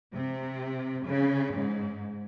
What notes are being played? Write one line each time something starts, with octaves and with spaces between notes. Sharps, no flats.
C3
C#3
G#2